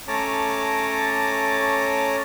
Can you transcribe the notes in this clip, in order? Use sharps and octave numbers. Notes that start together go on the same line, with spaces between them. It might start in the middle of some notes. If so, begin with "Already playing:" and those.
A3 C#4 C#5 A5 A#5 D6